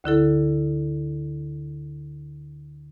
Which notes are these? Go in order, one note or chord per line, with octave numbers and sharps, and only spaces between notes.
D2 D3 E4 A4